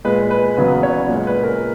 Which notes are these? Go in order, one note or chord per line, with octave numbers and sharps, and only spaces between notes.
A#2 G#3 B4
B4
E2 C#3 F#3 B4
C#5
A#2 G#3
B4
A#4